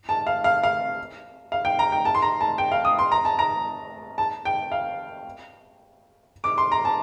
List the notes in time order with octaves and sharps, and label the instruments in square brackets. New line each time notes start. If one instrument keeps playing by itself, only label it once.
[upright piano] A5
F5
F5
F5
F5
G5
A#5
G5
A5
C6
A#5
A5
G5
F5
D#6
C6
A#5
A5
A#5
A5
G5
F5
D6
C6
A#5
A5